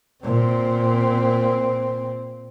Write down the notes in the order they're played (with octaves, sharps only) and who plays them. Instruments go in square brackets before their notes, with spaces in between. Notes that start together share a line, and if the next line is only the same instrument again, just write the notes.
[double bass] A#2 C4